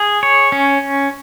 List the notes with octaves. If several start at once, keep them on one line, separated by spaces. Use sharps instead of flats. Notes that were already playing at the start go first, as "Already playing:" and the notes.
Already playing: G#4
C#5
C#4